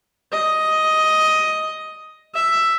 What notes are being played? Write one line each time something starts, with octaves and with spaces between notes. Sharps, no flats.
D#5
E5